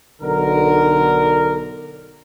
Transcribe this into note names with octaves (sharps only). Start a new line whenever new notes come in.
B1 D3 D#4 A#4